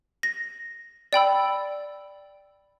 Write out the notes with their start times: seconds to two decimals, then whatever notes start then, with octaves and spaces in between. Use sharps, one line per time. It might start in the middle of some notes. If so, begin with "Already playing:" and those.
0.23 A#6
1.13 D5 G5 B5 E6